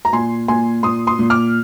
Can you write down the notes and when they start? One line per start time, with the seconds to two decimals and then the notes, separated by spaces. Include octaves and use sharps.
0.05 A#5
0.13 A#2 G#5 C6
0.48 A#2 G#5 C6
0.83 A#2 C6 D#6
1.07 C6 D#6
1.19 A#2
1.30 D6 F6